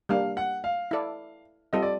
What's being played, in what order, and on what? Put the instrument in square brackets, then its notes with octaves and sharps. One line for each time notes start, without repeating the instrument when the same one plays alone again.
[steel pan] G3 A#3 D4 [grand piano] F5
[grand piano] F#5
F5
[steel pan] E4 A4 D5
[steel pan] G3 C4 F4 A4 [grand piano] D#5
[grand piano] D5